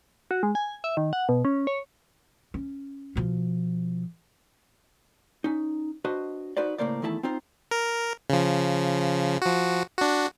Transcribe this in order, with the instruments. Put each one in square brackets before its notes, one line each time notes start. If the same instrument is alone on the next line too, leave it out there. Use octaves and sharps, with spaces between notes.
[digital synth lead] F#4
G#3
G#5
E5
D#3
F#5
B2
C#4
C#5
[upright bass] C#4
B2 F3
[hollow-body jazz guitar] C#4 D#4
D4 F#4 B4 C5 D#5
D#4 F#4 B4 C5 D5
A2 C#3 A#3 A#4 C5 D5
E2 D#3 A3 E4 D5 A5
C4 D#4 F4 C5
[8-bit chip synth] A#4
C#3 F3
F3 F#4
D4 F#4